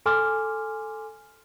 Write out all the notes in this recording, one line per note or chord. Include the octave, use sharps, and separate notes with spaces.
A4 G#5 C6 D6 F6